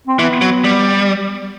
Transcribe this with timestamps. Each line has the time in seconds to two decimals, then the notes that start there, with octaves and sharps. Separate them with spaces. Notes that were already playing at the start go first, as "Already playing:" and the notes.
0.07 C4
0.19 E3 B3
0.41 F#3
0.64 G3